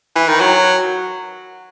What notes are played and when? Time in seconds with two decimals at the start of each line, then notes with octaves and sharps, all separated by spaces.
0.16 E3
0.28 D#3
0.40 F#3